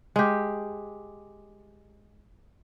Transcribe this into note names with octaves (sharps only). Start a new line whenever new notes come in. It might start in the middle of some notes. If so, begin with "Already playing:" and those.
G#3 G4